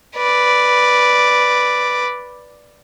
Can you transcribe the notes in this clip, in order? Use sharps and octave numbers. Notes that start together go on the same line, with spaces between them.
B4 D5